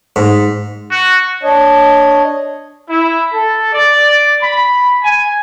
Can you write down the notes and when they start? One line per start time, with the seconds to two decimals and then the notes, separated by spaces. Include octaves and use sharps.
0.16 G#2
0.90 F#4
1.43 D4 C#5 D#5
2.89 E4
3.33 A4
3.72 D5
4.43 B5
5.04 G#5